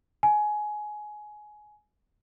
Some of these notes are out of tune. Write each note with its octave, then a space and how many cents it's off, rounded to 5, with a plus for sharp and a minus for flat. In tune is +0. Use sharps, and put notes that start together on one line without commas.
G#5 +20